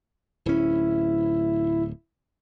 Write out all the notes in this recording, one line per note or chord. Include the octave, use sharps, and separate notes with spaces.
D1 C#4 E4